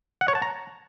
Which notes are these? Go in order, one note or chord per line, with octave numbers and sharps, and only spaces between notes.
F#5
C#5
A5
A#5